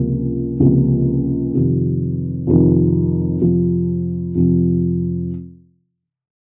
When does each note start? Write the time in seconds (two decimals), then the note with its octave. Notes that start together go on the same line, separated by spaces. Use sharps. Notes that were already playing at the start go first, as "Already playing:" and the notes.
Already playing: C#2 C3 F3 A#3
0.60 C#2 C3 F3 A#3
1.53 F2 C3 D#3
2.47 F2 C3 D#3
3.41 F2 C3 F3
4.35 F2 C3 F3